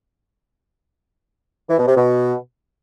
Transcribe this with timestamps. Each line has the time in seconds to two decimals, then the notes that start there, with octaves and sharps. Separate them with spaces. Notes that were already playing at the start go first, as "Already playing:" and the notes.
1.69 E3
1.78 B2
1.87 C3
1.96 B2